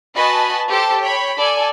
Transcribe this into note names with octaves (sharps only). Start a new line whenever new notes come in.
F#4 B4 D#5 G#5 A5 B5
G4 A4 C5 A5
C#5 G5 B5
A4 D5 G#5